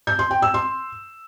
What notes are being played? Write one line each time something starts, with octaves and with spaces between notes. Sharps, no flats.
G6
C6
G5
E6
C6